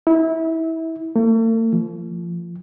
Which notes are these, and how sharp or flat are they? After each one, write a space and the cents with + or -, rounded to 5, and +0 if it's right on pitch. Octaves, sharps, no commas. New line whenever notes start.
E4 -25
A3 +45
F3 -20